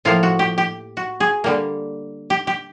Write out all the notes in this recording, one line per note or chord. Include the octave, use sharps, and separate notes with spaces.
A2 F3 A#3 F4
F#4
G4
G4
F#4
G#4
D3 G3 A#3
G4
G4